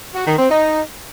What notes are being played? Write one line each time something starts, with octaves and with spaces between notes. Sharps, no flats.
F#4
D#3
C4
D#4